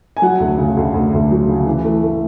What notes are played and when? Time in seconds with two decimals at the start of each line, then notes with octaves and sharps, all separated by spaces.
0.17 G#5
0.22 F#3 F#5
0.40 D2
0.58 C#3
0.77 D2
0.94 D2
1.13 D2
1.31 F#3
1.49 C#3
1.66 E3
1.84 A3
2.03 A3